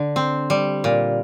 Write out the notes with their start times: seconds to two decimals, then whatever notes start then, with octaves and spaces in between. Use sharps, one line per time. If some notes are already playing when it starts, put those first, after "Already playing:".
Already playing: D3
0.16 C4
0.50 G3
0.84 A#2